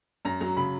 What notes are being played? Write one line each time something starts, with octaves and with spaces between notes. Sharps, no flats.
F#2 A#5
F#3 A#5
C#3 B5